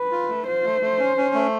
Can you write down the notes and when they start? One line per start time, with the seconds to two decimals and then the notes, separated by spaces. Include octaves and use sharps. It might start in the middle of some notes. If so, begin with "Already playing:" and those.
Already playing: B4
0.11 F4
0.29 A3
0.47 F4 C5
0.64 A3
0.81 A3
0.99 C#4
1.17 C#4
1.34 A3